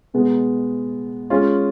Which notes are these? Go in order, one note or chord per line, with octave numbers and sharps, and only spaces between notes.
B2 G#3 B3
G#3 C#4 F4